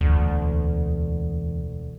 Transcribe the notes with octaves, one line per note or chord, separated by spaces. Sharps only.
E1 D2